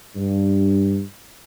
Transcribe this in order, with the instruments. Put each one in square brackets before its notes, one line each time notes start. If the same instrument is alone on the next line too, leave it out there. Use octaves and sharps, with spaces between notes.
[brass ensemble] G2